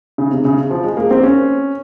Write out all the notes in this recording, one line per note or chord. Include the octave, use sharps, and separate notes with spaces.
C#3
C3
C#3
F3
G#3
A#3
C4
C#4